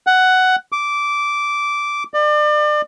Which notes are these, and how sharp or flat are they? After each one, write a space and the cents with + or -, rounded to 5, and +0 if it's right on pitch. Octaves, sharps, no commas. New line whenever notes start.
F#5 +10
D6 -10
D5 +35